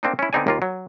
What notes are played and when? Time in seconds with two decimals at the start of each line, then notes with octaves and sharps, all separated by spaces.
0.03 A#3 C4 D4 D#4
0.19 C#4 E4
0.33 D3 B3 C4 D#4 D5 G#5
0.47 D#2 A#3 F4
0.62 F#3